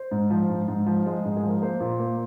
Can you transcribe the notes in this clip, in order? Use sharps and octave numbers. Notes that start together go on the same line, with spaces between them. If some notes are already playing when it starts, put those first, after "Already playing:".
Already playing: C5
G#2
F3
G#2
G#2
F3
G#3
G#2
G#4
F3
A#4
A#3 C5
A#2
A#3